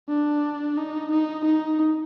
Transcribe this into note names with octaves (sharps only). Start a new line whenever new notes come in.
D4
D#4
D#4
D#4